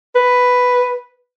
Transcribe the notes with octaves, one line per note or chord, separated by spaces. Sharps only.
B4